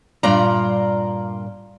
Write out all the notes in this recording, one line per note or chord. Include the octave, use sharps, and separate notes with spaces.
G2 A#2 F4 D5 A#5